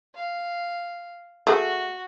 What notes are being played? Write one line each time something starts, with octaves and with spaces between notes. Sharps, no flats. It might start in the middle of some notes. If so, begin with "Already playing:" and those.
F5
A3 F#4 G#4